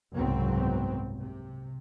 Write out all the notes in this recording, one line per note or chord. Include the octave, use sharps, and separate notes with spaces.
F#1 C2 G#2 F#3 B3 C4
C3